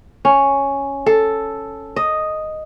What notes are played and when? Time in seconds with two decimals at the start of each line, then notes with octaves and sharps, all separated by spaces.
0.25 C#4
1.06 A4
1.96 D#5